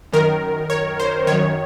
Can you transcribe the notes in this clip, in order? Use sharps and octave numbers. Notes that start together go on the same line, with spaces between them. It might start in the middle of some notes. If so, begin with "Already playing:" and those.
F#2 D#3 A#4
C#5
C5
F#2 D#3 C#5